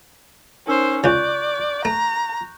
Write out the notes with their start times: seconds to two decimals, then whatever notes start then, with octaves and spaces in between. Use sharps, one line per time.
0.67 C#4 D#4 A#4 C5 E6
1.04 C#2 C#3 D5 C#6 F#6 G6
1.85 A3 A#5